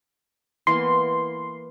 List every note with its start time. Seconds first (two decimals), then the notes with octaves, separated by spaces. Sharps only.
0.67 E3 A#3 B3 C6